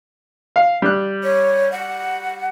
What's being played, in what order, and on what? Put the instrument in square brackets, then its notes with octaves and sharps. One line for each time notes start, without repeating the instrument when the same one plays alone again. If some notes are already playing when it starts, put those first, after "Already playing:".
[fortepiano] F5
G3 F#6
[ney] C#5
F#5